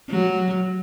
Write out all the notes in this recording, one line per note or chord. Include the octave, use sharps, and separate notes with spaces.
F#3